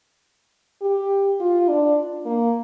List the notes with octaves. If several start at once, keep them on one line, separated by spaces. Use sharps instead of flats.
G4
F4
D4
A#3